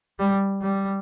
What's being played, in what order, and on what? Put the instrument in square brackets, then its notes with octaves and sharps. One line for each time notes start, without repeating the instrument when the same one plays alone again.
[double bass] G3
G3